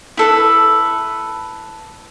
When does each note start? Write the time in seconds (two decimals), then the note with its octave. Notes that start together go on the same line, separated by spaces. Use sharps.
0.17 E4 A4 B4